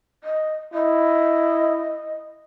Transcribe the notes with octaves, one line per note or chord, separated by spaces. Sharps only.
D#5
E4 D#5